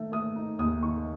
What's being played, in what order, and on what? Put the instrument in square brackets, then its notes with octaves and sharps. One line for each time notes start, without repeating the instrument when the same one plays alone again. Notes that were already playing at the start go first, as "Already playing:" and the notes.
Already playing: [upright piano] D#3 A3
A3 D#6
D#4
D#2 D#6
D#3 C#6